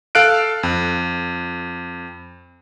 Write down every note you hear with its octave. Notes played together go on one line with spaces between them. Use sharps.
A4 F5 F#6 D7
F2